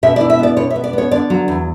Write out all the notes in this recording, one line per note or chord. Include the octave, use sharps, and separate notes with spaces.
B2 E5
E4 D5
E5
B3 D5
B2 C#5
E5
B3
D5
B3 C#5
D3 D5
F#3
E2